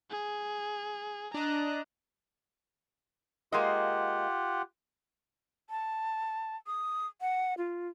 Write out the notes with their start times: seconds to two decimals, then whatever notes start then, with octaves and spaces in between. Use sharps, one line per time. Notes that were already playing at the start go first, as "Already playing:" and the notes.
0.11 G#4
1.34 D4 D#5 A#5 F#6
3.52 G#3 A#3 F4 G4 D#5 F#5
5.70 A5
6.67 D#6
7.21 F#5
7.58 F4